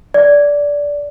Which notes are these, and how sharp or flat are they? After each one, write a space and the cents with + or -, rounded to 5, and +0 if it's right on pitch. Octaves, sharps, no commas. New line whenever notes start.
D5 -15